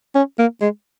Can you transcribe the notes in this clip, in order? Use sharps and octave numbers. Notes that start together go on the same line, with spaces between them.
C#4
A#3
G#3